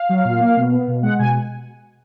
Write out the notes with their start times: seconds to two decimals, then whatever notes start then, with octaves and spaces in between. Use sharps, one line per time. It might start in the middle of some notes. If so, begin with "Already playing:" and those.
Already playing: F5
0.09 F#3
0.25 A#2
0.40 A#3
0.56 B2
0.72 B3
0.88 B2
1.03 G#3 F#5
1.19 B2 G#5